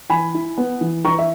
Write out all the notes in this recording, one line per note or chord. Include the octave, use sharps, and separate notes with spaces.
E3 G#5 B5
E4
B3
E3
E3 A#5 C#6
E5